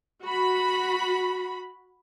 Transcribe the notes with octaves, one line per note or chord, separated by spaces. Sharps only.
F#4 B5